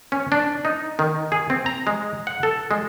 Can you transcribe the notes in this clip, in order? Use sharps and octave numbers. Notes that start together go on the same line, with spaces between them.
C#4
D4
D#4
D#3
G#4
C4
A#5
G#3
F#5
A4
G#3